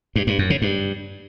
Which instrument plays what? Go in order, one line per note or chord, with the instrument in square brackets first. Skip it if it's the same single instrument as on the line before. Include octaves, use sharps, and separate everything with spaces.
[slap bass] G2
G2
F#2
C#3
G2